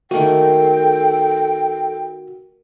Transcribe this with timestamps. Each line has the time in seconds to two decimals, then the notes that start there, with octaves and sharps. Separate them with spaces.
0.11 D#3 A3 A#3 F#4 A4 G5